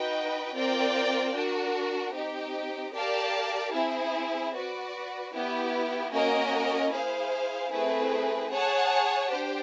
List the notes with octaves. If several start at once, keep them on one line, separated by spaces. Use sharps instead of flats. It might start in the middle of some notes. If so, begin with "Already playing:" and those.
Already playing: D#4 F#4 B4 D#5 G5
C4 F4 A#4 D5 G5
D4 F#4 A#4
C4 D#4 G4
G4 A#4 D5 F5 A5
C4 E4 G#4
F#4 B4 D5
B3 E4 G4
A#3 C#4 F#4 A#4 D#5
E4 G#4 C5 F5
A3 C4 E4 G#4 B4
G#4 C#5 F#5 A5
D4 G4 C5